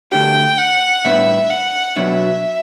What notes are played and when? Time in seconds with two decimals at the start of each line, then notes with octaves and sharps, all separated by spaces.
0.12 D2 D3 A3 D4 G4 G5
0.58 F#5
1.05 A2 G3 B3 D4 E5
1.50 F#5
1.96 B2 F#3 B3 D4 E5